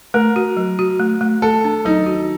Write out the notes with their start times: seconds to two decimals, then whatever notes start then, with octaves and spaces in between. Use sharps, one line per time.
0.14 A3 A#4
0.36 F#4
0.57 F#3
0.79 F#4
1.00 A3
1.21 A3
1.42 A3 A4
1.64 D4
1.85 F#3 D#4
2.06 F#4